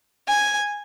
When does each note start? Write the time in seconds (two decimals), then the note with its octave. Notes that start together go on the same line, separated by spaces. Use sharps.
0.28 G#5